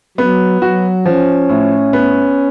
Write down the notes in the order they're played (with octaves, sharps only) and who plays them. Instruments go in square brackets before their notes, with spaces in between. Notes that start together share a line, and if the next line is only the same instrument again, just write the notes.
[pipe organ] F#3 [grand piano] B3
[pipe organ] F#3 [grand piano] F#4
[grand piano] F3 [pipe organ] C#4
[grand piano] A2
B3